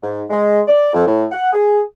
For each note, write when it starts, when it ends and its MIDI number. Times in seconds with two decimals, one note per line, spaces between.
0.02 0.22 44
0.30 0.61 56
0.68 0.90 74
0.93 1.06 41
1.06 1.24 45
1.32 1.52 78
1.52 1.80 68